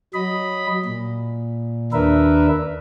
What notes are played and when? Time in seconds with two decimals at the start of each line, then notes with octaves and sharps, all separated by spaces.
0.14 F#3 D#5 B5
0.85 A#2
1.93 D#2 D4 A#4 B4 E5